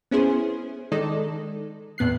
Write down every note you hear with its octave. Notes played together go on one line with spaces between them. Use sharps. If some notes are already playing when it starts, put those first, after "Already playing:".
B3 C#4 E4 G#4 C5
D#3 G#3 D#4 A4 D5
E2 A2 B3 F#6 C7